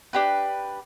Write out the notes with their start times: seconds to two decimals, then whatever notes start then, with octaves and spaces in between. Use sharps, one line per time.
0.13 D4 G4 B4